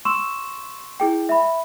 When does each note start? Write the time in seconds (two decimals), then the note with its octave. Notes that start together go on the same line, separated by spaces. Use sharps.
0.05 C6 C#6 E6 E7
1.00 E4 G#4 G5
1.29 E5 B5